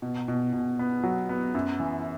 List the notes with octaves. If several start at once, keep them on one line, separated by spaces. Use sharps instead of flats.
B2
B2
B2
B3
F#3
B3
F#2
E3